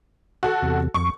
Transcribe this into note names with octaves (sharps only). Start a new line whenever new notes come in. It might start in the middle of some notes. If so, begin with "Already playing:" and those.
F#4 A4
E2 C3
F2 C#6